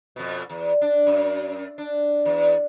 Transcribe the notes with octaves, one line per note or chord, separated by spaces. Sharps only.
F2 B2
E2
D4
F#2
D4
E2